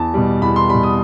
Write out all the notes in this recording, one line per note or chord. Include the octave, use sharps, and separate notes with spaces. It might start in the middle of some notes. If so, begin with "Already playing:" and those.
Already playing: E2 A5
B2 G3
E2 B5
C6
B2 G3 B5
D#6